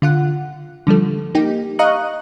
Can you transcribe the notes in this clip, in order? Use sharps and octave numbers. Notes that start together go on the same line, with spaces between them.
D3 F4 F#5
D3 F3 G3 A3
A#3 D#4 G4
D#5 F5 A#5 C#6 D#6 F#6